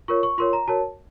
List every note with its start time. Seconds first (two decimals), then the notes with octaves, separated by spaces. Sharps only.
0.08 F4 A#4 C#5 C#6
0.23 C#6
0.38 F4 A#4 C#5 C6
0.53 A#5
0.68 F#4 A#4 C#5 A5